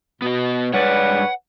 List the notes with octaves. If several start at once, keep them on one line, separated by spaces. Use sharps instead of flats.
B2 B3 D#5
G2 G#3 B4 C#5 D5 F#5